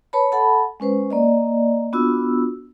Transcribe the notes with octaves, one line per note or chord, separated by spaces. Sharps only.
B4 C#5 A5 B5
A4 F#5 A5 B5
G#3 C#4 B4 C5
A#3 D5 D#5
B3 D4 F4 F#4 E6